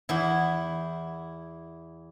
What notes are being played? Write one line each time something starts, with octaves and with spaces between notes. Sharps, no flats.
E2 E4